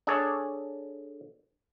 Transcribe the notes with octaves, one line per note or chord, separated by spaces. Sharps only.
D4 G#4 A4 C#5